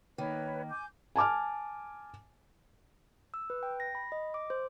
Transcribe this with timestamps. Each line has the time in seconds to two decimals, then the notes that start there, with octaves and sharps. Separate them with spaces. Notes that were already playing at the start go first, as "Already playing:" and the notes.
0.18 D#3 A#3 B4 C#5
0.69 G#5 D6 G6
1.16 G#5 A5 D6 F6
3.34 E6
3.50 B4
3.63 G5
3.80 A#6
3.95 B5
4.12 D#5
4.34 D6
4.50 C5